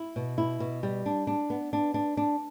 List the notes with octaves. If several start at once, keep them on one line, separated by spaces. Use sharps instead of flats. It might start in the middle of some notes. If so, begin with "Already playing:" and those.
Already playing: E4
B2
E4
B2
G3
D4
D4
B3
D4
D4
D4